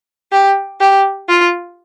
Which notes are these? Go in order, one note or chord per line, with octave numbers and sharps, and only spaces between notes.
G4
G4
F4